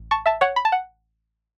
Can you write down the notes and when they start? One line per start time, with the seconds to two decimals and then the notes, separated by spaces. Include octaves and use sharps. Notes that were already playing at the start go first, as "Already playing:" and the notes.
Already playing: A1
0.11 A5 C#6
0.26 E5 A5
0.41 C#5 F#5
0.56 B5
0.65 A5
0.72 F#5